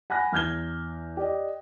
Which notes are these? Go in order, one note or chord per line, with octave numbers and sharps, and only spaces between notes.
F#5 G#5 B5 F#6 A#6
E2 F6 G6 G#6 G7
G4 D5 D#5